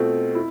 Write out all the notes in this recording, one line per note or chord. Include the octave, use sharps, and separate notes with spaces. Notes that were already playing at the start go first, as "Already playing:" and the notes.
Already playing: B2 A3 C4 F4
E4